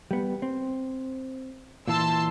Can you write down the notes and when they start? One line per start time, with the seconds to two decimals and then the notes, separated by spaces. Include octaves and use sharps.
0.11 G3 B3
0.42 C4
1.88 A#2 E3 A5 C6 E6